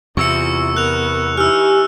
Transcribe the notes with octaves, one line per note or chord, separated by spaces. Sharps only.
E2 C3 E3 F4 C#6 E6 C#7
B3 A#4 F#6 F7
E3 D#4 G4 G#5 E6 F6